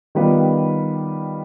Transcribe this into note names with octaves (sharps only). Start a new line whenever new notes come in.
D#3 G3 B3 F4 B4